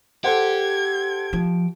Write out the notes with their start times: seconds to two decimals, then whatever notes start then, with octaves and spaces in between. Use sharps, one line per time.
0.24 G4 A4 C5 F#5 G#6
1.33 F3